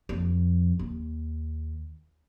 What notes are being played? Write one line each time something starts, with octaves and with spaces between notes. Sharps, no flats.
F2
D#2